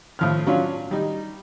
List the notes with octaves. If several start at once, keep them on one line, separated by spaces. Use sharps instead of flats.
A2 F3 F6
F#3 C#4 D4 F4
G3 D#4